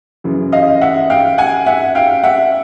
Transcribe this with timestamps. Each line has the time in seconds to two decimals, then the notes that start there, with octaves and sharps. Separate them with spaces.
0.24 F#2 C#3 E3
0.52 D#5 F5
0.81 E5 F#5
1.10 F5 G5
1.38 F#5 G#5
1.66 E5 F#5
1.95 F5 G5
2.23 E5 F#5